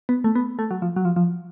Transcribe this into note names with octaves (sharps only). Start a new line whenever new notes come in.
B3
A3
B3
A3
F#3
F3
F#3
F3
F3